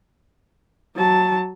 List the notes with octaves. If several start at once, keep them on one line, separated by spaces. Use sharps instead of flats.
F#3 A5